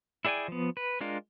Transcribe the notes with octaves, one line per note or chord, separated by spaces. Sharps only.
E4 G#4 D5 G5 G#5
F3 B3
B4
G#3 D4 F4 A#4